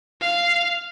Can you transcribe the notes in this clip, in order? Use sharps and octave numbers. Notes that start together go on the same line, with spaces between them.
F5